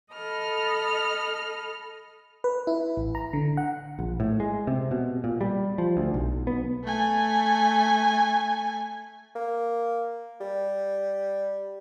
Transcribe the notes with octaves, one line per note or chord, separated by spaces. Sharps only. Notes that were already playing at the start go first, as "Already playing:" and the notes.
A4 D#5 B5 F6
B4
E4
A1
A#5
D3
F#5
A#1
A2
G#3
C3
B2
A#2
G3
F3
D2
B1
B3
A3 G#5
A#3
G3